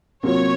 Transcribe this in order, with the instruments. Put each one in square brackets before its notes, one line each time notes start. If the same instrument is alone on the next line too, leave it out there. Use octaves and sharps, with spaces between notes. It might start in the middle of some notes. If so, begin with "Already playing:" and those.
[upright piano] C3 F#3 A#3 F4 [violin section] C#5